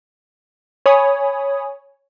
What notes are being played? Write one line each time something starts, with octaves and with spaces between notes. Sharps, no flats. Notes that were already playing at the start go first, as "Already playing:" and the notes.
C#5 G#5 B5 D#6